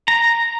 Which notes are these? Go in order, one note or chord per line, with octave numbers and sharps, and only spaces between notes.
A#5